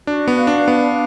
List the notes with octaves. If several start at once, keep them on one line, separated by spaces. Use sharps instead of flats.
D4 F#4
B3
F5
D4
B3 D4